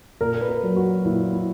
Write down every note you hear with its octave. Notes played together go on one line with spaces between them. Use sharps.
A#2 A#4
B4
A#4
F#3
F#4
A#2 E4
E4